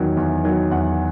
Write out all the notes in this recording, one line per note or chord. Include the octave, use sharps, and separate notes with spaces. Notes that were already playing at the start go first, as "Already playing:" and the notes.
Already playing: E2 D#3 F#3
E2
D#3 F#3
E2 F#5